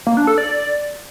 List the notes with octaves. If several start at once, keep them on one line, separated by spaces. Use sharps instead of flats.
A#3
D4
A4
D5